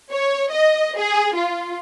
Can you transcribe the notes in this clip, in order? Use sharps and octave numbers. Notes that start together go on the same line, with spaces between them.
C#5
D#5
G#4
F4